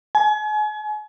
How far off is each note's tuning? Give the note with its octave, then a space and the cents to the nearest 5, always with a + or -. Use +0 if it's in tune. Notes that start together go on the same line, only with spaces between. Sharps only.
G#5 +35